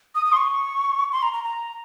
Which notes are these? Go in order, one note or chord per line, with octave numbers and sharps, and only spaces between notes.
D#6
D#6
C6
C#6
C6
A#5
A#5
A#5